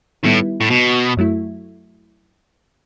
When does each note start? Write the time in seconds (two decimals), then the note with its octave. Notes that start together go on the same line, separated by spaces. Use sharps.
0.23 A2 D#3 G3 B3 E4
0.61 A2
0.70 B2
1.17 F#2 F#3 A3 E4